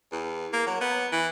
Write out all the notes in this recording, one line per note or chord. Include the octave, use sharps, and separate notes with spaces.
E2
A#3
F#3
B3
E3